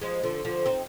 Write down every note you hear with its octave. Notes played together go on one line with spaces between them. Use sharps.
F3 G#3
D3 F3
D3 F3
C4 D#4